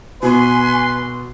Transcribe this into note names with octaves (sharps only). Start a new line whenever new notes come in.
B2 B4 G#5 C6